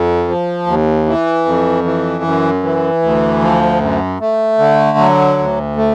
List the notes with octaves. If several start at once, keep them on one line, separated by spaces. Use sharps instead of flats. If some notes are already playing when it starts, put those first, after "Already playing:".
Already playing: F2
F3
D#2
E3
F2
E3
F#2
E3
D2
F3
F#2
A3
D3
F#3
D2
A3